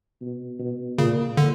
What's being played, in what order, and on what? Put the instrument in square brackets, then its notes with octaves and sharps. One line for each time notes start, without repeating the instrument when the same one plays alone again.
[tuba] B2
B2
[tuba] A#2 [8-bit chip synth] C#3
[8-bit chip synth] D3